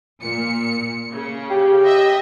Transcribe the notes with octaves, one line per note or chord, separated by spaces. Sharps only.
A#2 C#7
C#3
G4
D#5 E5